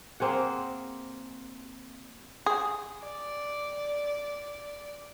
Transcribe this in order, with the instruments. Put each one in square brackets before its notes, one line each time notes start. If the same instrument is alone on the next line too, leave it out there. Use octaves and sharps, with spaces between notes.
[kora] A#3 C4 G#4 F#5
[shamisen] G#4
[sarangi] D5